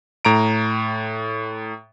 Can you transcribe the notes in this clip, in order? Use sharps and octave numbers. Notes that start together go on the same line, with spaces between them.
A2 A#5 D7